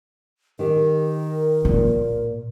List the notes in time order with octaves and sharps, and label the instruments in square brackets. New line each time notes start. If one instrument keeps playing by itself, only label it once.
[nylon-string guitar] D#3 G4 [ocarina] A#4
[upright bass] A#2